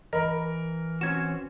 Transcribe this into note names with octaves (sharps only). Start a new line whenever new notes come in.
E3 A#4 D#5 B5
C4 C#4 F#4 G#6 E7